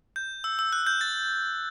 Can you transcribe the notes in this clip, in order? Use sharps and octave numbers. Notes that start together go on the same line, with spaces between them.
G6
E6
E6
F#6
G6
A6